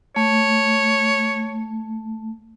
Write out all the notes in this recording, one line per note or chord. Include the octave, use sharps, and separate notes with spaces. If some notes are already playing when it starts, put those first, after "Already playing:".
A3 C#5